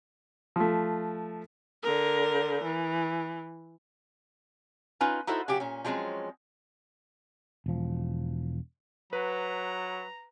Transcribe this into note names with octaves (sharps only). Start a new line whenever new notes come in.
F3 A3
D3 A#4
E3
C#4 D#4 F4 B4
D#4 E4 F#4 A4 C5
C#3 F#3 F#4 G4
A#2 C#4
F3 F#3 G#3 C4 C#4
E1 F3
F#3 B4 A#5